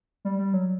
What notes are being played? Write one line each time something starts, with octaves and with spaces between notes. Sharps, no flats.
G3
G3
F#3